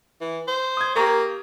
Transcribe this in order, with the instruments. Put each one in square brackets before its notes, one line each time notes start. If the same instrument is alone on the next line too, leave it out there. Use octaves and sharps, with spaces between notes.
[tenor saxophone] E3
C5
[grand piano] D#6 G#6
[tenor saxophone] A#3 [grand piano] G4 A#5 C#6